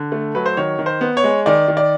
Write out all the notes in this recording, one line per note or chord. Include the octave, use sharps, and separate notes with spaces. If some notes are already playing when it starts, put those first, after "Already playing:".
Already playing: D3
A3
F#3 B4
C5
D#3 C#5
D#3
C5
B3
C#5
G#3
D#3 D5
D#3
D5